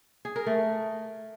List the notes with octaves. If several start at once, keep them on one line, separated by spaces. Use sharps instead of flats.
G#4
A#4
A3